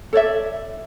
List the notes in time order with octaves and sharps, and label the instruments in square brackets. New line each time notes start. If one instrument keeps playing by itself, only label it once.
[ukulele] A4 C#5 D5 E5